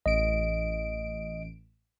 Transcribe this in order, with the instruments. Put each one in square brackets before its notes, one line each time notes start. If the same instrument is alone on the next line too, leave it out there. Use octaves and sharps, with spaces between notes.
[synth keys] A1 D7 [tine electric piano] D#5